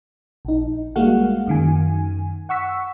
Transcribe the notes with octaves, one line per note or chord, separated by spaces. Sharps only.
A#1 D#4
G3 G#3 A#3 F#4 F5 F#5
F#2 D#3 G#5
F#5 C#6 E6 B6